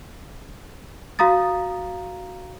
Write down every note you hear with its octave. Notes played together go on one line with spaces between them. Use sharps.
F#4 F5 A#5 D#6 A6